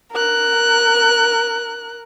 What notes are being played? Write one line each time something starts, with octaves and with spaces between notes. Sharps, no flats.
A#4 F#6